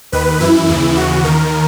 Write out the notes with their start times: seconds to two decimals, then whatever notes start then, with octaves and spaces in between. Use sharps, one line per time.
0.12 D#2 D#3 B4
0.40 F#2 E3 E4
0.68 D#2 C#3 E3 E4
0.97 D#2 C#3 E3 F#4
1.24 D#2 D#3 A#4